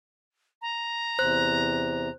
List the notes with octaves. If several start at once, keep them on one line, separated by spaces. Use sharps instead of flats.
A#5
E2 C3 C5 F#6